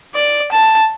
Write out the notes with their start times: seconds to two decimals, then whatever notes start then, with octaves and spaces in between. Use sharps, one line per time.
0.15 D5
0.52 A5